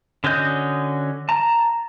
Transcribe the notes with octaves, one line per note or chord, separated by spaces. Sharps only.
D3 C#4 F#4 D#5 G6
A5 A#5